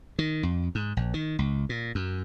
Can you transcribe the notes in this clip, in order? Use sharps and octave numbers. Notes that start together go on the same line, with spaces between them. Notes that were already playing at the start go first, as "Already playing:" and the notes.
D#3
F2
G#2
A#1
D#3
C#2
A#2
F#2